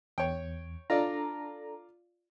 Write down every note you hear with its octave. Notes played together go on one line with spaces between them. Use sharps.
E2 C#5 G5
D4 F4 A4 D5 A#5